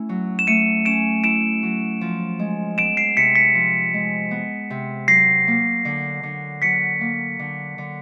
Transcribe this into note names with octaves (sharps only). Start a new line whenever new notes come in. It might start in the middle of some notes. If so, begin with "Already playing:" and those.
Already playing: A3 C#4 E4
F#3
E7
A3 C#7 D#7
C#4 D7 E7
E4 D7 E7
F#3
F3
G#3
B3 D7 E7
C7 D7
C3 B6 C#7
B6 C#7
F3
G#3
B3
C3
F#3 A#6 C7
A#3
D3
D3
F#3 B6 C#7
A#3
D3
D3